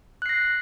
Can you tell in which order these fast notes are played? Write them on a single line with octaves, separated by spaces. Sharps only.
F#6 C7 A#6